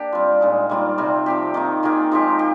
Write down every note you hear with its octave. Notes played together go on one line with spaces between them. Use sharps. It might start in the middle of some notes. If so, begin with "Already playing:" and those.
Already playing: A#3 D4 G4
G3 C4 F4
A#2 G#3 D#4
D#3 G3 A#3 F4
C3 G3 C4
F3 C4 G4
D#3 A#3 D#4
D#3 A#3 F4 G#4
F3 G#3 D#4 G4
G4